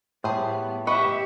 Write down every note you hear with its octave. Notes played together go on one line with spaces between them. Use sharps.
A2 G3 B3 G#4 C5
G4 B4 D#5 E5 F#5 C#6